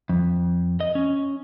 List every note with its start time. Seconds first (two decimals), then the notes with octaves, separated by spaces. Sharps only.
0.09 F2
0.80 D#5
0.95 C#4